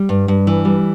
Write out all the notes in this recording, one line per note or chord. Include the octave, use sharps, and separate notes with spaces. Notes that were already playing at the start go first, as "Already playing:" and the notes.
Already playing: G3
G2
G2
E3
G3